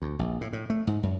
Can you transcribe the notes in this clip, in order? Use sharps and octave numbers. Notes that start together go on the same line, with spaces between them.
D2
A#1
A2
A2
A3
G#2
F#2